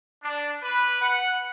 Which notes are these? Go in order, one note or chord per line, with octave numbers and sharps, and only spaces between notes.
D4
B4
F#5